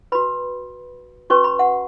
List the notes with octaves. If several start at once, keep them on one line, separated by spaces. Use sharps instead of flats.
F#4 B4 B5
C#4 F#4 B4 C#6
B5
F#5